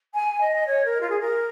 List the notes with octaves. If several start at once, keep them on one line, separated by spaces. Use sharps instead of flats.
G#5
D#5
C#5
A#4
F4
G#4
A#4